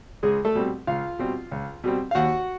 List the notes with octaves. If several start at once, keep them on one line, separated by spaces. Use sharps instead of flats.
C#2 G#3 G#4
A3 A4
B2 G3 C4
C#2 F4 F5
B2 G3 C4
C#2
B2 G3 C4
F5
D#2 F#4 F#5